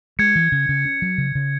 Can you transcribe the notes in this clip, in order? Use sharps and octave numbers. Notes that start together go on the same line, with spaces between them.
G#3 G#6 C#7
E3
C#3
C#3
C#4
F#3
C#3
C#3